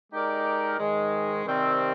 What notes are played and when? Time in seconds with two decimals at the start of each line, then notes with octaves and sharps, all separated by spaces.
0.12 G#3 D#4 G4 A#4 D5
0.79 G#2 D#3 G#3
1.45 C3 D#3 G3 C4